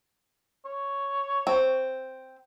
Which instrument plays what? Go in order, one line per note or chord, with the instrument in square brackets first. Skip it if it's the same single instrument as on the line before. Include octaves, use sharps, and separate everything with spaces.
[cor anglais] C#5
[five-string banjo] C4